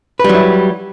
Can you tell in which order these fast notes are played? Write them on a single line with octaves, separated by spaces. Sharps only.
B4 G3 F#3 E4